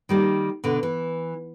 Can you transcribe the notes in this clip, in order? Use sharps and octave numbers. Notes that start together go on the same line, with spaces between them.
D#3 G3 A#3
B2 D3
E3